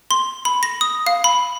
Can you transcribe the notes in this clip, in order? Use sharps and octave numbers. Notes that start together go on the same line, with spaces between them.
C6
B5
A#6
D#6
F5
B5